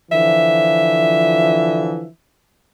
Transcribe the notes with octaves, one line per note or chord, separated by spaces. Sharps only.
D3 E3 F3 E5